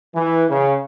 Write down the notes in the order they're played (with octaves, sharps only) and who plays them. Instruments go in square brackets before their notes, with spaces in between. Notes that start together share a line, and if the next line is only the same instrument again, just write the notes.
[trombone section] E3
C#3